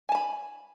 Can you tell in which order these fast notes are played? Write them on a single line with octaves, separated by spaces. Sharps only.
G#5 A5 B5